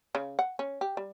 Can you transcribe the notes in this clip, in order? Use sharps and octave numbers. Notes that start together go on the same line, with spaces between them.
C#3
F#5
C#4
G4
G3